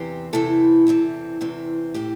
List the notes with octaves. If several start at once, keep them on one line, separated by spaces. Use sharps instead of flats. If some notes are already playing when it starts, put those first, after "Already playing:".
Already playing: E2 C3 E3 C4 G4 C5
E2 C3 E3 C4 E4 A4
E2 C3 E3 C4
E2 C3 E3 C4
A2 E3 C4 G4